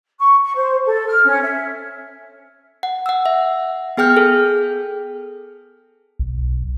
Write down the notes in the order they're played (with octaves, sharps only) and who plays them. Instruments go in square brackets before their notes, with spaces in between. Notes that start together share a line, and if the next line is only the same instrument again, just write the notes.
[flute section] C#6
C#6
C5
A4
F6
C#4
E5
[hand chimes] F#5
F#5 E6
E5
B3 G#4 G5 F6 G6
G#4 A4
[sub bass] B1